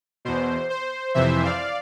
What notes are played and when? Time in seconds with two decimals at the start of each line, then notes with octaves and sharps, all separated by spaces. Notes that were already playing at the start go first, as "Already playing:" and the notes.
0.25 E2 B2 C5
0.70 C5
1.14 F2 C3 E3 C5 E5
1.45 D5 F5